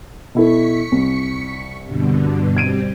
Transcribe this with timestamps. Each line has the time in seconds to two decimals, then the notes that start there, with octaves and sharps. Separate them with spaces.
0.35 B2 E4 A4 C#6 B6 C#7
0.92 C2
1.86 G2 B2 D3
2.57 G3 C4 G#6 D7 D#7